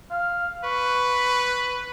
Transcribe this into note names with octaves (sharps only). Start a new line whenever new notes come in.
F5
B4 C#6